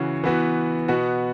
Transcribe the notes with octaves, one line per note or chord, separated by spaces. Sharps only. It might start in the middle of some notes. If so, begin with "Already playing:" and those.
Already playing: C#3 E3 C#4 F#4
E3 B3 F#4
B2 B3 F#4